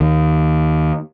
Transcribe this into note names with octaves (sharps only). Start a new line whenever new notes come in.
D#2